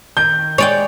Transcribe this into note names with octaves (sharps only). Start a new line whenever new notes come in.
D#3 G6
G#3 C#5 D5 G5